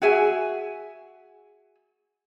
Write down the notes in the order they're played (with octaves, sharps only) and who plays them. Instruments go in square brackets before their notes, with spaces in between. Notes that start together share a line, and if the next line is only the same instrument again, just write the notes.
[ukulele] F#4 G#4 E5 G#5